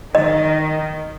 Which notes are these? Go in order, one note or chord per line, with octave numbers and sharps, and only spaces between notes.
D#3 D#5